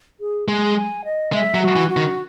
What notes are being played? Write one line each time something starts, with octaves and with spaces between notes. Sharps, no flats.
G#4
G#3 G#4
G#5
D#5
G#3 E5
F#3
F#4
E3
F#4
D#3